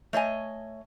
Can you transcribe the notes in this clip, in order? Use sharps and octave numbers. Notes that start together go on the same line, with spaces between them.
A3 C#5 D#5 G#5